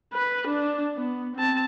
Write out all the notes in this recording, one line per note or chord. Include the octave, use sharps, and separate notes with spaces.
B4
D4
B3
C4 A5